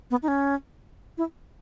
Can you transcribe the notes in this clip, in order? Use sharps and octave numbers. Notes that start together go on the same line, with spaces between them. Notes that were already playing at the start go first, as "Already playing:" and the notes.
B3
D#4
C#4
E4